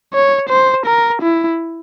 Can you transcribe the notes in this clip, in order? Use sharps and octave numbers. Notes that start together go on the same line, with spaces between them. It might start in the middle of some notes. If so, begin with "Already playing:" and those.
C#5
C5
A#4
E4